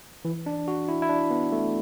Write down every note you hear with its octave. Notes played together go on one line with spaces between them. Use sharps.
E3
D4
F#4
E4
E4
D4
B3
A3